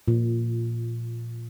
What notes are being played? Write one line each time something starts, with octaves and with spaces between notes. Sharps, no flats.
A#2